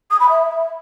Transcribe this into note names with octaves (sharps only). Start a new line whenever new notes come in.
D#6
B5
E5